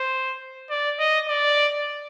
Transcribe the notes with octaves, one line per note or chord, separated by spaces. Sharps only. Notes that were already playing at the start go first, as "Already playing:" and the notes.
Already playing: C5
D5
D#5
D5